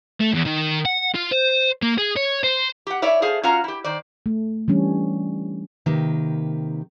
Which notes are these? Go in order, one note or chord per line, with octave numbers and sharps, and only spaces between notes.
A3
E2
D#3
F#5
F4
C5
A#3
G#4
C#5
C5
G4 F#5
E4 C#5 D5 E5
A3 G#4 C5 F5
C#4 F4 F#4 F5 A#5
E4 G4
D#3 C5 D5
A3
E3 G3 C#4 D4
C3 D#3 A#3 G4 B4